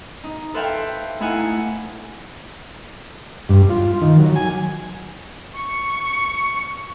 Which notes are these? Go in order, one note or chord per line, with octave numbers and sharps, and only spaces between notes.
D#4
A4 B4 C5 E5 F5 G5
A3 D#4 E4 F5 F#5 G#5
G2
F4
D#3
F#3
G#5
C#6